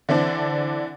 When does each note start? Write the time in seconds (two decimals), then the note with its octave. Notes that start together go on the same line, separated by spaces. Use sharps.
0.09 D3 E3 C4 D4